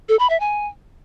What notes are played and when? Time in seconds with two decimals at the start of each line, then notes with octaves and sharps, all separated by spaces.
0.09 A4
0.19 B5
0.30 E5
0.40 G#5